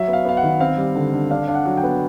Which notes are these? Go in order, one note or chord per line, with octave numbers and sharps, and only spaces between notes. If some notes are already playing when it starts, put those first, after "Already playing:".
Already playing: F#3 E5
B3
F5
B3 F5
F#5
D#3
C4 F5
G3
D3
D3
D4 F5
D4 F5
F#5
F#3
G5
B3